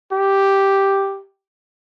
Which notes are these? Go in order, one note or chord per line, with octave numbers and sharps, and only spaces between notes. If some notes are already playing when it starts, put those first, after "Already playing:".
G4